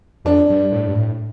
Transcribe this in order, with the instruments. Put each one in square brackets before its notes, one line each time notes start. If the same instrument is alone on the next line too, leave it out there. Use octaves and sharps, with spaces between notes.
[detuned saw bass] F2 [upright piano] D4
[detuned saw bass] G2
A2
G2
A2